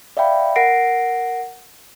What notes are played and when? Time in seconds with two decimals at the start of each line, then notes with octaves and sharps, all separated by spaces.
0.17 D5 E5 F5 G5 B5
0.56 A#4 F#5 A#6 C7 D7